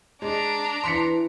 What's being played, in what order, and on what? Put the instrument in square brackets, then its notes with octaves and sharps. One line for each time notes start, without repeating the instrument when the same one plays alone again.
[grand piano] G#3 [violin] D4 A#5
[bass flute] E3 [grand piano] C6 B6 C#7